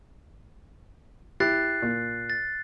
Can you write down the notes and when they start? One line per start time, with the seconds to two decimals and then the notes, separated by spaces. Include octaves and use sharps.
1.40 E4 G4 F#6 A6 C7
1.82 A#2
2.30 A6